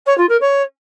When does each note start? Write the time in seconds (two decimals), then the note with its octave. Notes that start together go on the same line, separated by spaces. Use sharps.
0.06 C#5
0.18 F4
0.29 A#4
0.40 C#5